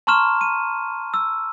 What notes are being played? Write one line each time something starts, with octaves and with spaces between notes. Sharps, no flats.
A5 A#5 C6 C#6 F6 E7
D#7
E6